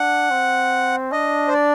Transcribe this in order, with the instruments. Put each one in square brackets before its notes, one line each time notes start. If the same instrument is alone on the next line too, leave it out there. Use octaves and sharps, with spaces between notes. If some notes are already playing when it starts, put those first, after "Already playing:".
Already playing: [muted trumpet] D4 [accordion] F#5
[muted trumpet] C4
[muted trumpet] D4 [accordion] D#5
[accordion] C5
D5